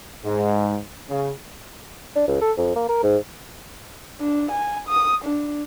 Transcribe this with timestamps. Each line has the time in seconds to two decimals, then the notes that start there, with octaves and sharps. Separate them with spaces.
0.24 G#2
1.10 C#3
2.16 D4
2.28 C#2
2.41 A4
2.58 F2
2.76 A#3
2.89 A#4
3.03 G#2
4.20 D4
4.52 G#5
4.88 D#6
5.25 D4